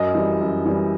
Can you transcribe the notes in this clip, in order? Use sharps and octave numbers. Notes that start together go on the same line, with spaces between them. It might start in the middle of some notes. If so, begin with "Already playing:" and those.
Already playing: F#2 D#5
E3 G3
F#2
E3 G3